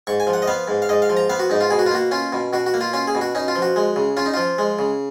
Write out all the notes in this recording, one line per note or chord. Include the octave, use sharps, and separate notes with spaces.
G#2 C#6
G#5
F3
F#5
D#5
B3 F5
G#2
F5
G#2 D#5
F5
F3
A#5
B3 F5
F#4
G#2 D#4
F4
B2 G#4
F#4
F4
A#3 F#4
C#4 F4
B2
B2 F#4
F#4
A#3
F4
C#4 F4
G#4
B2
F#4
C#4 D#4
F4
F3
F#4
G#3
C#3
C#4 F4
D#4
F3 F4
G#3
C#3